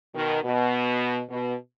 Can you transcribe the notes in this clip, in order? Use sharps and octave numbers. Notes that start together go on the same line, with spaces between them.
B2 D#3
B2
B2